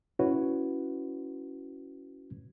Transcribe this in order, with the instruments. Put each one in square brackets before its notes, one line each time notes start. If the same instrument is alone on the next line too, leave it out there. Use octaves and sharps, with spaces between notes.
[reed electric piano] C#4 E4 F#4 B4 C#5